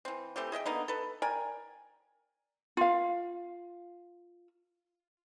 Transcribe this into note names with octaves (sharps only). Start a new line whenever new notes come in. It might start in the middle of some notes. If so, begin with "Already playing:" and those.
E3 C4
E3 A3 C4 G4
G#4 D#5 E5 G5
D3 A#3 B3 D#4
A4 B4
A#4 D5 G5 G#5
F4 F5